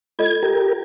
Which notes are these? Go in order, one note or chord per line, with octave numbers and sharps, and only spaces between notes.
F4 A4 D#5 G#6
G4 A#4